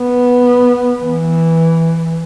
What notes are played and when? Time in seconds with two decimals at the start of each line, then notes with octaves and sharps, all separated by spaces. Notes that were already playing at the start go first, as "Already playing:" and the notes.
Already playing: B3
1.02 E3